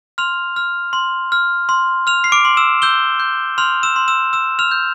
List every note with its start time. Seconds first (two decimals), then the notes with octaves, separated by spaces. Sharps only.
0.18 C6 F6 F7
0.56 F6
0.93 C6
1.32 F6
1.69 C6
2.07 F6 F7
2.24 C7
2.32 D6 D7
2.45 C6
2.57 E6 E7
2.82 E6 G6 G7
3.20 G6
3.58 C6 F6 F7
3.83 E6 E7
3.96 C6
4.08 E6 E7
4.33 E6 E7
4.59 F6 F7
4.71 G6